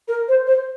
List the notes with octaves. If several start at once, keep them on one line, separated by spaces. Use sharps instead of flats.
A#4
C5
C5